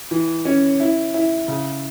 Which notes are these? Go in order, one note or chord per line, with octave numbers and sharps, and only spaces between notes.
E3
C#4
E4
E4
C#3